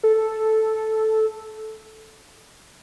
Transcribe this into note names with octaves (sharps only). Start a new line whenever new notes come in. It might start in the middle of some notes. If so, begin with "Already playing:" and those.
A4